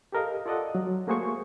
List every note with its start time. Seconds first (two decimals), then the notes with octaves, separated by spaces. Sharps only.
0.12 G4 A4 A#4 D#5 F5
0.46 F4 A4 D5 D#5 F#5
0.75 F#3
1.07 A3 A#3 F#4 G#4 C5 C#6